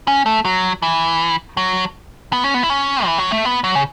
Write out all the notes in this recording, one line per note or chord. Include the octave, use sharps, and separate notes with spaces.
C#4
A3
F#3
E3
F#3
B3
C#4
B3
E4
C#4
E3
F#3
A3
B3
F#3
C#3